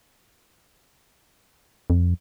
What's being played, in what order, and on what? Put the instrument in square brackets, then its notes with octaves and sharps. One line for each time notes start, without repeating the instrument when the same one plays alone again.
[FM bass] F2